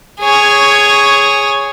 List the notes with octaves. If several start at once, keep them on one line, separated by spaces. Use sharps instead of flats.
G#4 C#5